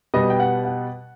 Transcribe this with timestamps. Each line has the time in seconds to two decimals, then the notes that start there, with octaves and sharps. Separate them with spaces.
0.14 B2 G3 B3 D#5
0.30 G5
0.40 F#5
0.65 F#5